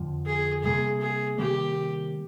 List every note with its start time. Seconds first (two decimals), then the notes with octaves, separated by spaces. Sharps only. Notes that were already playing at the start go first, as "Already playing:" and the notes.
Already playing: F2 D3 F3
0.26 G#4
0.63 C3 G3 A#3 G#4
1.01 G#4
1.38 C3 D#3 G3 A#3 G4